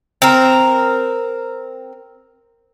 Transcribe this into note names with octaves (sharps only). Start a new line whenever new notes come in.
C4 A#4